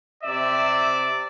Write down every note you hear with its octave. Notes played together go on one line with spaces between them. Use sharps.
C3 D5 E5